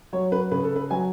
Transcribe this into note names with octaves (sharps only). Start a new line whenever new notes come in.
F#3 C#5
B4
C#3 B4
A4
B4
F#3 G#5